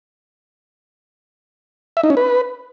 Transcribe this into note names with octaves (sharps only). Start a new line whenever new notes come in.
E5
D#4
C#4
B4